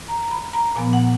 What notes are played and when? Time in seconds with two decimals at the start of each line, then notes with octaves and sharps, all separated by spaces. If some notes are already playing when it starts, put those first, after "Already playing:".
Already playing: F2 D#3
0.08 A#5
0.23 A#5
0.31 B5
0.53 A#5
0.76 A#2 F3 B3 G#5
0.93 F#5